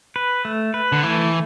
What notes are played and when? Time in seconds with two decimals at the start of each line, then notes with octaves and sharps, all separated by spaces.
0.16 B4
0.45 A3
0.74 B4
0.92 D3
1.03 E3 A3